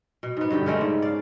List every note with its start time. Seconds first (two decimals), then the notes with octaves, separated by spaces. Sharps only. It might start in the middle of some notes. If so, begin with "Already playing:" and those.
0.23 B2
0.37 G#2 B3
0.51 G2 D3 G4
0.66 C#3 G#3 A3 C#4
0.81 G#2
1.02 D5 F5